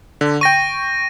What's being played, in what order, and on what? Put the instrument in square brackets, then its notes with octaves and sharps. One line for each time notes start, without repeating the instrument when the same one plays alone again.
[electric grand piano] D3
[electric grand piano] G5 C#6 [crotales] A#6 D#7